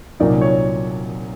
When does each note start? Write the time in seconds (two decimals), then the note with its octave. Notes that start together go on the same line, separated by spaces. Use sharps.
0.20 C2 A#2 F#3 A#3 D#4 D5
0.41 C#5